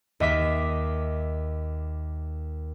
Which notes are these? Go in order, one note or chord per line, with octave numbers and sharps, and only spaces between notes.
D#2 D#5 E5 D6 B6